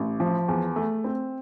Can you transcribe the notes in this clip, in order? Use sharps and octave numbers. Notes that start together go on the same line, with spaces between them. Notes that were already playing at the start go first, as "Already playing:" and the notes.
Already playing: A1
F3
E2
A3
C4